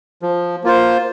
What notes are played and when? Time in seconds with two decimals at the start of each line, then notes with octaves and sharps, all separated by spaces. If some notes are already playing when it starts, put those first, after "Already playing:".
0.22 F3
0.64 A#3 F4 C5